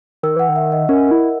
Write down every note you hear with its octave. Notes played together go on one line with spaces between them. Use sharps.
D#3 E6
E3 F#5
D#3
E5
D#5
C#4 A#4
E4 A#4